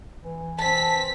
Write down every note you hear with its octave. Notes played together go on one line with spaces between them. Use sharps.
E3
C4 A5 B6